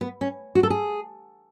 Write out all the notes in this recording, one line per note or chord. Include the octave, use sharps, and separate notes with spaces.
B3
C#4
F#4
A4
G#4